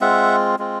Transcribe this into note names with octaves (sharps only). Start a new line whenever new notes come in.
G#3 C4 F4 E5 F#5
G#3 C4 F4